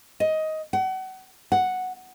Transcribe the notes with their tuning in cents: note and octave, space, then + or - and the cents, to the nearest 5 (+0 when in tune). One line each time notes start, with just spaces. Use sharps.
D#5 +15
F#5 +35
F#5 +0